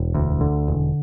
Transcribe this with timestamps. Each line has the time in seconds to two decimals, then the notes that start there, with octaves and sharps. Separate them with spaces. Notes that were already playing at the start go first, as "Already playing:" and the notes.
Already playing: E1
0.14 D2
0.41 D3
0.68 E1